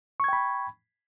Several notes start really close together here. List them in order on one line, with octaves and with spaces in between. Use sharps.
C#6 G#6 G5 B5